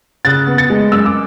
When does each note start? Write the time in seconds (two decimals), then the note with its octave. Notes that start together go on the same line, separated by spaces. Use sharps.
0.25 C#3 F#6 A6
0.47 B3
0.58 A6 C#7
0.70 G#3
0.92 F#2 E6
1.05 D6